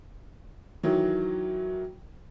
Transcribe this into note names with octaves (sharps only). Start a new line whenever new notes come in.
D#3 E3 F#3